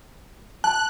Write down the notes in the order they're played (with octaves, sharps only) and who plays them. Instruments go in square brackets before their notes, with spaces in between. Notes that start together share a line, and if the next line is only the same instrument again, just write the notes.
[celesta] A5 [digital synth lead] F#6